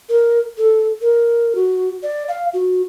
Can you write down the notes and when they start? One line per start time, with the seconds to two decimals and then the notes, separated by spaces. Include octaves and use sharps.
0.09 A#4
0.58 A4
1.01 A#4
1.55 F#4
2.03 D5
2.28 F5
2.53 F#4